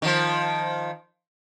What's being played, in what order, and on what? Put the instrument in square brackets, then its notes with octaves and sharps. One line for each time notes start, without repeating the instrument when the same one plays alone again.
[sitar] D#3 F3